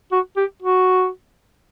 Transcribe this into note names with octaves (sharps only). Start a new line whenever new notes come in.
F#4
G4
F#4